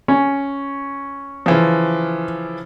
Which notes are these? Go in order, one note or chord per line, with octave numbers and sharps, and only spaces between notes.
C#4
C#3 E3 F3